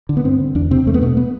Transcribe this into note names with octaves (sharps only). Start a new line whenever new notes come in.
D3
B3
G2 C4
D3
E2 D4
C3 C4
E2 A3
B3
B2 A3
B3